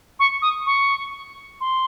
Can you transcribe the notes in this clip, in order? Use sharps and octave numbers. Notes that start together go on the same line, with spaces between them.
C#6
D#6
C#6
C6